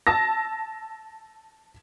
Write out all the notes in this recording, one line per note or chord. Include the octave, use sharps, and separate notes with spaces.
A5 E6 A#6